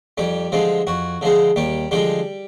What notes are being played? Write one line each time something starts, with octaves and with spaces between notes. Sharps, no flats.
F2 G3 G4
D3 F3 G#3 C4
F2 F#4
D3 F3 G#3 C4
D#2 G3 G4
D3 F3 G3 G#3 G4